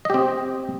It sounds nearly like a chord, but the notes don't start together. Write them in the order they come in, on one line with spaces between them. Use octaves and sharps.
D#5 G4 C4